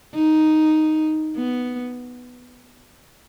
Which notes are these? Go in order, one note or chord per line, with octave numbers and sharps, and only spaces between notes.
D#4
B3